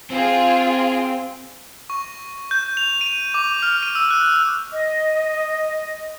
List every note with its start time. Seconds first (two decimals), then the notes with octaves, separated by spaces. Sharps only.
0.10 C4 F4 G#4
1.90 C#6
2.51 G6
2.77 F7
3.01 D#7
3.34 D6
3.63 F6
3.83 D#7
3.95 E6
4.11 F#6
4.73 D#5